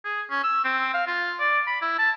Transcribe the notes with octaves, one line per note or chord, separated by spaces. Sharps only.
G#4
C#4
E6
C4
F5
F4
D5
B5
E4
A5